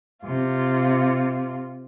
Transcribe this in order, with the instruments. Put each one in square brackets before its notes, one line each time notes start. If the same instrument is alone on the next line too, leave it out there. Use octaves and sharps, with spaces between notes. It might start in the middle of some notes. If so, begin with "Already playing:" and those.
[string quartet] C3 F4